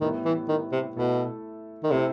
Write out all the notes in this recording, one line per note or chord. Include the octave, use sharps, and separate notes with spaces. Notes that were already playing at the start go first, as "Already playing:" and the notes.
A2 D#3 G3 B3 E4
E3
D#3
C3
B2 A3 E4 A4
D#3
C3 A3 C4 E4